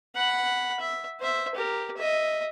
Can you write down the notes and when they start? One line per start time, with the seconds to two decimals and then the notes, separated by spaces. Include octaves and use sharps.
0.15 F#5 B5
0.79 E5
1.20 C5 E5
1.55 G4 A#4
1.97 D#5 E5